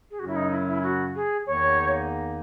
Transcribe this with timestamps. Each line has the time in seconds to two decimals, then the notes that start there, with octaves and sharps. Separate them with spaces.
0.11 G#4
0.19 F#2 C#3 F#3 C#4 F#4
0.27 E4
0.36 D#4
0.52 E4
0.68 E4
0.83 F#4
1.15 G#4
1.46 E2 D#3 A#3 D#4 C#5